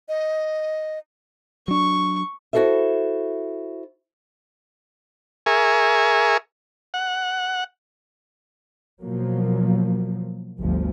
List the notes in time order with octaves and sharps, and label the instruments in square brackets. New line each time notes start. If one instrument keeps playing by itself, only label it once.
[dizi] D#5
[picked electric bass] F#3 D4 [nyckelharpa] C#6
[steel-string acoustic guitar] E4 F#4 G#4 A4 C5 E5
[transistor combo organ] G#4 A#4 E5 G#5 C#6
F#5
[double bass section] B2 F3 F#3 A#3
G1 D2 F3